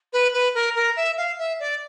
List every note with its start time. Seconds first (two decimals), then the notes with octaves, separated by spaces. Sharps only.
0.13 B4
0.33 B4
0.54 A#4
0.75 A#4
0.96 E5
1.17 F5
1.38 E5
1.59 D5